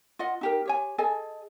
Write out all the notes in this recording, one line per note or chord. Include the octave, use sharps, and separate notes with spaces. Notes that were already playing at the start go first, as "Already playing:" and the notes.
F4 D#5 F#5
D#4 G4 A#4
G4 C#5 G#5
G#4 A4 D#5 G#5